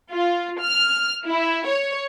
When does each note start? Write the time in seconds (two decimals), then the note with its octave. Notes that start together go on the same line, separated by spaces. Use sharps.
0.10 F4
0.61 F6
1.25 E4
1.67 C#5